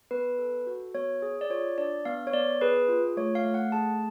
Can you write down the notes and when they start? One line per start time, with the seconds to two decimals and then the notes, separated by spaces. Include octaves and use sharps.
0.11 B3 B4
0.39 A4
0.67 F#4
0.94 B3 C#5
1.22 G#4
1.41 D5
1.50 F4 C#5
1.78 D4 D5
2.05 B3 F5
2.27 C#5
2.33 B3 D5
2.61 G#4 B4
2.89 F4
3.17 A3 C#5
3.35 F5
3.44 A3
3.54 F#5
3.72 G#4 A5